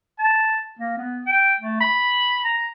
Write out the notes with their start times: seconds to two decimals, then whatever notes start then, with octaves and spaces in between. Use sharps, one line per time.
0.19 A5
0.79 A#3
0.97 B3
1.26 G5
1.60 A3
1.81 B5
2.45 A#5